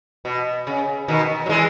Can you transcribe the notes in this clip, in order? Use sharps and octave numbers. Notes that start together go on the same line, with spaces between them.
B2
C#3
B2 D#3
F#3
E3 G#3